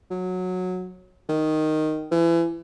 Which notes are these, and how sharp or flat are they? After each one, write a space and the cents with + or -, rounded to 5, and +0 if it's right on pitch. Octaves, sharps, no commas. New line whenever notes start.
F#3 -15
D#3 -5
E3 +30